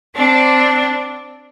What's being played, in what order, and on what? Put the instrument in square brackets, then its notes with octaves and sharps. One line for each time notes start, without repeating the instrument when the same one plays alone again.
[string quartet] C4 D4